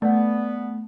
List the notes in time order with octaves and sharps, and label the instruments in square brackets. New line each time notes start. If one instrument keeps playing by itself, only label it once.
[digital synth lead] A3 [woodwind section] B3 [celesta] D5 F#5